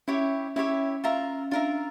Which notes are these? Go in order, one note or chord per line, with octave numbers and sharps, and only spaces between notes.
C#4 E4 G4 C#5 E5
C#4 E4 G4 C#5 E5
F4 A#4 E5 A#5
D4 F4 A#4 E5 A#5